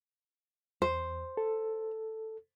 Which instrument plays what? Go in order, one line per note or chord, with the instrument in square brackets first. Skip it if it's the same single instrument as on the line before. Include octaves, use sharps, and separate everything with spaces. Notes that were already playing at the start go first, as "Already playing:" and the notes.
[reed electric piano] E2 [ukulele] C5
[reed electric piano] A4